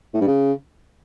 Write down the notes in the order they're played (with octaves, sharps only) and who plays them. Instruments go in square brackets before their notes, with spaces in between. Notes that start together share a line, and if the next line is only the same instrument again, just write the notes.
[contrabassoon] A2
G2
C#3